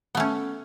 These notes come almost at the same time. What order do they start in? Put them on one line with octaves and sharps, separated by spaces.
B3 A3 C#4